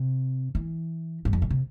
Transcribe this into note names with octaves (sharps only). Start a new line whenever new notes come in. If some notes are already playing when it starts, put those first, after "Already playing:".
Already playing: C3
E3
G2
F2
A2
C3